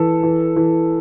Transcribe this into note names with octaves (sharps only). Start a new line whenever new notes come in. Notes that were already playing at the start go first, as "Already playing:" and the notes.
Already playing: E3 A4
E3
E3